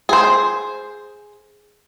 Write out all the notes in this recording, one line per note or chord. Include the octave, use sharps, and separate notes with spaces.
G#4 C5